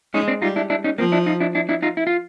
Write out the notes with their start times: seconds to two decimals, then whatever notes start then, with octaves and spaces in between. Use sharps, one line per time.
0.14 G#3 C#4 D#4
0.28 C4 D4
0.42 G3 D#4 F4
0.56 D4 E4
0.70 D4 E4
0.84 C#4 D#4
0.98 F3 A#3 C4
1.12 D4 E4
1.26 D#4 F4
1.40 D4 E4
1.55 D4 E4
1.69 D4 E4
1.82 D#4 F4
1.97 E4
2.07 F4